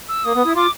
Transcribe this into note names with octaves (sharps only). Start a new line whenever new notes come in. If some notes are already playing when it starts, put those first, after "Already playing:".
E6
A#3 D#6
B3
E4
F4 D6